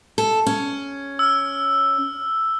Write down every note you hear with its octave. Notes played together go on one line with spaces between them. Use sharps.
A4
C#4
E6 F6